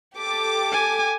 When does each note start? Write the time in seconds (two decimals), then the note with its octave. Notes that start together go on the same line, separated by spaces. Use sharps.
0.18 G4 A4 D6
0.72 G#5